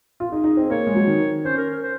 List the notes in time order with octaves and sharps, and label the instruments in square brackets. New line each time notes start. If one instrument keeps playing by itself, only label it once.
[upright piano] F4
[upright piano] D#4 [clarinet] G#4
[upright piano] D#4
C4
[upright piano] A#3 [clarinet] C#5
[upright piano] G#3
F#3
D#3
[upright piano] C#4 [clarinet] C5
[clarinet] A#4
A#4
C5